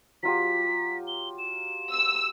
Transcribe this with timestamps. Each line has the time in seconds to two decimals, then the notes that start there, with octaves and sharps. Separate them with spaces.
0.23 F#3 F4 G4 B6
1.07 G7
1.38 E7
1.91 E6